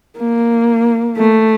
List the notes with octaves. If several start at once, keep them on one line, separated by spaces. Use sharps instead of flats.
A#3
A3